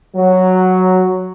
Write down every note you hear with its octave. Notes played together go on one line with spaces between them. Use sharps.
F#3